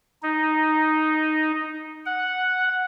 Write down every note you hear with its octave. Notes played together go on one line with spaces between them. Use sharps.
D#4
F#5